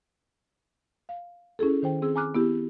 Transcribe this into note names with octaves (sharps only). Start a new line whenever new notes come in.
F5
C#4 E4 G#4 A4
D#3 C5 G5
C4 G#4 E6
G#5 A#5 D6 F6 F#6
B3 E4 G4